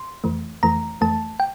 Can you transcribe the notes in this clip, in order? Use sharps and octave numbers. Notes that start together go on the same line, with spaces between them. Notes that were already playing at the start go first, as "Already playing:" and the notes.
Already playing: C6
F2 E3 A3
F2 E3 A3 A#5
F2 E3 A3 A5
G5